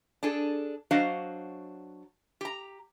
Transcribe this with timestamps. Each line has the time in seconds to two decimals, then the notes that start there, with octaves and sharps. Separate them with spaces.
0.23 D4 G#4 A4
0.91 F#3 D4 F#4 C5 D#5 F5
2.41 G4 A#5